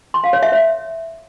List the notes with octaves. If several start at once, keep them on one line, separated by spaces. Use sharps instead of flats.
C6
F5
C#5
E5
C#5